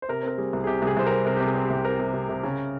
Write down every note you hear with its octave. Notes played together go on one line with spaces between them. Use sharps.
C5
C3 A#4
C4 A#4
G3 G#4
C2
G#4
C3 G4
C2 G#4
C2 C5
C4 A#4
C3 A#4
C3 G4
G#4
C4
G4
C2
C4 A#4
C3
C3
C3
C#3